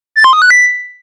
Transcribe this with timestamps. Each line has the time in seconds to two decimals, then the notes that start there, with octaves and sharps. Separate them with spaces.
0.16 A6
0.24 C6
0.33 D#6
0.42 F#6
0.51 B6